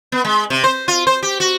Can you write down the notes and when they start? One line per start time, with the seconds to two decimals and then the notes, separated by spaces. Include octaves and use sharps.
0.12 B3
0.25 G#3
0.50 C3
0.64 C5
0.88 F4
1.07 C5
1.23 G4
1.40 F#4